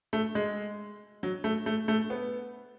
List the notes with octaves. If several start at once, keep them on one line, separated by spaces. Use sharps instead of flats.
A3
G#3
F#3
A3
A3
A3
B3